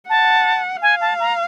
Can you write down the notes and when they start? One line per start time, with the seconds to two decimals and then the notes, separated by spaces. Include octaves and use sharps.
0.10 F#5 A5
0.82 F5 G#5
1.01 A5
1.20 A#5